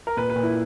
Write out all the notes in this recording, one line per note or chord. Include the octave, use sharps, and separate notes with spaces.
A#4
A#2 B4
B4
A#2
E4